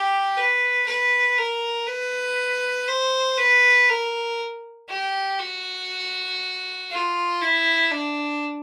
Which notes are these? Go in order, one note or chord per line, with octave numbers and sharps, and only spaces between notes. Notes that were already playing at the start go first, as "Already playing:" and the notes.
Already playing: G4
B4
B4
A#4
B4
C5
B4
A#4
G4
F#4
F4
E4
D4